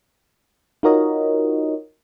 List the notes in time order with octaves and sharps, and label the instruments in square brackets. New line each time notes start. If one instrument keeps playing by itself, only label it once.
[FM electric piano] D#4 F4 F#4 A#4 C#5 D#5